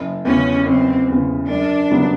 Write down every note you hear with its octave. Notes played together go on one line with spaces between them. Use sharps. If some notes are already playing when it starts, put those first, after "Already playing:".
Already playing: F#1
E2 C#3 C#4
F#1 C4
E2 C#3
F#2 D4
C#3 F#3 B3